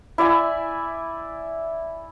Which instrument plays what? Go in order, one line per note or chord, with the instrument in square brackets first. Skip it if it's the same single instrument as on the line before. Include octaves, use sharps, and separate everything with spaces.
[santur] E4 D5 E5 G#5